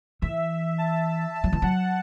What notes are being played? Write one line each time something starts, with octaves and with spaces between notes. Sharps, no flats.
E3 E5
A5
A5
F#3
E3
F#3 F#5